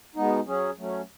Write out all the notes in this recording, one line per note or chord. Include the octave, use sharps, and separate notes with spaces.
B2 G#3 B3 D#4
F#3 C#4 G#4
F#3 A3 C#4